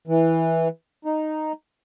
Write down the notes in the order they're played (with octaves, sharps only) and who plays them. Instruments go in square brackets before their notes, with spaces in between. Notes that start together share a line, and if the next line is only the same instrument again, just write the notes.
[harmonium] E3
D#4